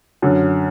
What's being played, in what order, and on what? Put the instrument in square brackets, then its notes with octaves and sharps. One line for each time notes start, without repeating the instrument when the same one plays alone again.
[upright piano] F#2 D3